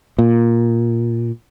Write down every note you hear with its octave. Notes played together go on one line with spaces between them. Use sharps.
A#2